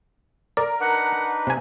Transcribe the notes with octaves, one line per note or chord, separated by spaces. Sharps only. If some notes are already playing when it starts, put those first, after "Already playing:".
A#4 D5
D4 D#4 B4 F#5
C3 C4 G#5